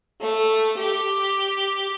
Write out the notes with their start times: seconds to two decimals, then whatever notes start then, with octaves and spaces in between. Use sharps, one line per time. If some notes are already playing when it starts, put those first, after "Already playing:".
0.21 A3
0.78 G4